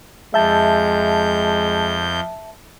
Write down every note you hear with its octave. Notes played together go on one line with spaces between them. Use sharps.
F2 G#3 E5 A5 G6